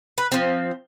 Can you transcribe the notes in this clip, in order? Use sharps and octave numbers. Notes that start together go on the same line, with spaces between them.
B4
F3 C4